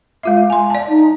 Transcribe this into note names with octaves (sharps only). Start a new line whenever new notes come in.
G#3 F4 E5
G#5 C6
D5 A5
D#4